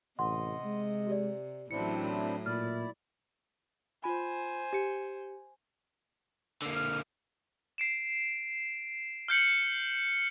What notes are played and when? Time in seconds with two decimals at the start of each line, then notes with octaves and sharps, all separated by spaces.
0.19 A1 C3 D#5 F#5 C6
0.65 G#3
1.07 G4 D5
1.71 A1 A2 F#3 C4 D4 E4 C#7
2.46 A#2 E4 D5 F6
4.04 F4 C5 G#5 B5
4.73 G4 C#7
6.62 D3 A#3
6.75 F6
7.78 C7 D7 E7
9.28 F6 G6 C#7 F#7